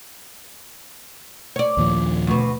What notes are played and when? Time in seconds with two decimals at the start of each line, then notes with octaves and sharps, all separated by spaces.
1.56 C#5 D5
1.77 D#2 A#2 F3
2.27 D2 B2